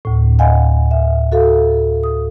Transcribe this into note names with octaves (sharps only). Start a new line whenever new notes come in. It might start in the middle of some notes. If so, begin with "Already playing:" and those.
D2 A2
D#5 F5 F#5 G#5
E5
F#4 A4 F5
D#6